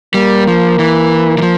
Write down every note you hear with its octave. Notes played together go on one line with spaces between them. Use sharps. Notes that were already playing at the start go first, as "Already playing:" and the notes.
G3 A#3
F3
E3
E3
F3